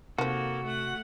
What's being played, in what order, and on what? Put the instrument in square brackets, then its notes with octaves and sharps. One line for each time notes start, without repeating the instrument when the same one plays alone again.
[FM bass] C3 [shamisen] D#3 F3 [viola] A#3 A4 [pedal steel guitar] F#4
[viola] A3 F#5